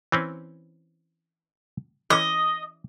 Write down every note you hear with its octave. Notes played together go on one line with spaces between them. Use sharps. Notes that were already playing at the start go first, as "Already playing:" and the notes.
E3 C4 C#4
E3 C#4 D#5